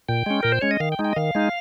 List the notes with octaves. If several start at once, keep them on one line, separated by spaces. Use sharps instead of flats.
A#2 G5
G#3 C#4
A#2 A#4
C5
G#3 C#4 C#5
D#5
D#3 F5
G5
G#3 D#4
G5
D#5
D#3 F5
G#3 D#4